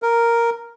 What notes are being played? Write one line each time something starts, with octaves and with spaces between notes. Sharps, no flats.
A#4